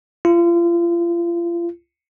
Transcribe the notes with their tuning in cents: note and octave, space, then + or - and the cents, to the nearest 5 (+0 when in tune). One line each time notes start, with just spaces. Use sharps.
F4 -35